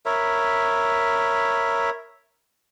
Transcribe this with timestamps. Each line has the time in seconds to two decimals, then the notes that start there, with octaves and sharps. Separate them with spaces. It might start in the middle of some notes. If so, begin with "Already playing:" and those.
0.06 A#4 C#5 E5 B5